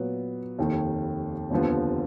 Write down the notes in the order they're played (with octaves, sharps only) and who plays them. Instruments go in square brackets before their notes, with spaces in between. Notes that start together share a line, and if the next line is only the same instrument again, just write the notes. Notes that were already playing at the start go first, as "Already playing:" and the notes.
Already playing: [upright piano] A#2 F#3 B3
F1 D#2 D#3
F1 D#2 D3 F3 B3